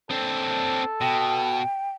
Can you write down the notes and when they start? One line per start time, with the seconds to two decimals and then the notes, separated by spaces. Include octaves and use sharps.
0.10 C4 D4 A4
1.01 B2 G5